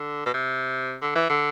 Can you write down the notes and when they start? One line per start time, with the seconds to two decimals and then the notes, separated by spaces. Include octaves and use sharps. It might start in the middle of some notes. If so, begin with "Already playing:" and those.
Already playing: D3
0.26 B2
0.34 C3
1.02 D3
1.16 E3
1.30 D3